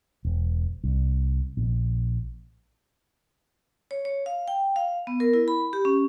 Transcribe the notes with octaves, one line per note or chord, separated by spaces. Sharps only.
E1
C2
A#1
C#5
C#5
F5
G5
F5
B3
A#4
E4
B5
G4
C#4